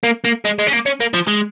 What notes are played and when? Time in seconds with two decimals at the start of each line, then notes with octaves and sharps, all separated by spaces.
0.03 A#3
0.25 A#3
0.45 G#3
0.59 G#3
0.67 C#4
0.73 A#3
0.86 C#4
1.00 A#3
1.14 F3
1.28 G#3